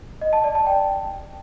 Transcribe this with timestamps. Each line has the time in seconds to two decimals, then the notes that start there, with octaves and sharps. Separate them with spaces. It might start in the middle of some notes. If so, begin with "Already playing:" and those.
0.21 D#5
0.33 A5
0.44 D5
0.55 A5
0.66 G5